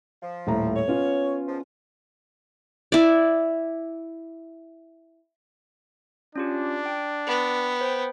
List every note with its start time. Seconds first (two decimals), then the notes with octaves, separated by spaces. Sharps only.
0.22 F3
0.47 D#1 A2 A#5
0.76 C#5
0.88 B3 C#4 F4
1.47 G#2 F3
2.92 E4 D5
6.36 C#4 D4 F4 G4
6.86 G5
7.27 B3
7.81 C5 G5